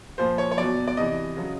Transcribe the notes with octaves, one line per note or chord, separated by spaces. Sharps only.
A#2 F3 C5
C#5
C#5
B2 F#3 D5
D5
C3 E3 D#5
C#3 F#3